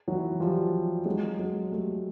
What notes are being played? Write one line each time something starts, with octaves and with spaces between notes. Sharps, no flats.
E3 F#3
F3 G3
F#3 G#3
F#3 G#3
G3 A3